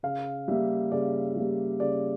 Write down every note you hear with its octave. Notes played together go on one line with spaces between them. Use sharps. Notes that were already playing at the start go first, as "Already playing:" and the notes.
C#3 F5
G3 A#3 E5
C#3 D5
G3 A#3
C#3 D5